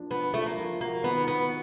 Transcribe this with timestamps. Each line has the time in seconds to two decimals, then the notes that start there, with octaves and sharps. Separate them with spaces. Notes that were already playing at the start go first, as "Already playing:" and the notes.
Already playing: F3 A#3 D4
0.10 F3 B3
0.34 F3 A3
0.46 A#3
0.57 F3
0.81 A#3 F#4
1.04 D#3 B3
1.27 B3 F#4